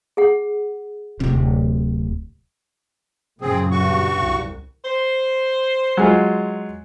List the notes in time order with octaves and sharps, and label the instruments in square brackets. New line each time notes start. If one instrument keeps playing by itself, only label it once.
[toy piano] G#4 F#5
[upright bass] D1 C3
[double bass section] F#2 A#2 C#3 [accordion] C4 G#4
[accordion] G2 F#4 C#6
[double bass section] C2
[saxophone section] C5
[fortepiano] F#3 G#3 F4